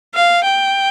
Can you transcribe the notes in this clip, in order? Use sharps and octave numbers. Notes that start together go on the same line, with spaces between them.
F5
G5